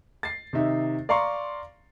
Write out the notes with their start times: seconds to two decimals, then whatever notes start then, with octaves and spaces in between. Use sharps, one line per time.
0.23 A6 C7
0.53 C3 D#3 D#4 E5
1.09 D5 F5 A#5 C6 C#6